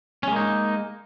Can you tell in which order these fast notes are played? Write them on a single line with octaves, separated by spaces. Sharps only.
C#4 G#3 A#3 D#4